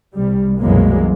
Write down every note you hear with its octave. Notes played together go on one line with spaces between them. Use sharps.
C2 G3
C2 F#2 B2 E3 G#3 A#3